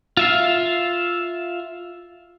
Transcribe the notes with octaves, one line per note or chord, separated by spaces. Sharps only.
F4 E5 F5